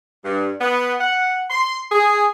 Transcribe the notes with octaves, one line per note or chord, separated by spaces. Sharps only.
G2
B3
F#5
C6
G#4